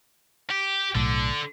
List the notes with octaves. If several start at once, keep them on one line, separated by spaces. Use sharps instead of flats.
G4
B1 A2 D3